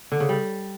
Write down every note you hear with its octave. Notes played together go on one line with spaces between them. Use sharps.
D3
C#3
G3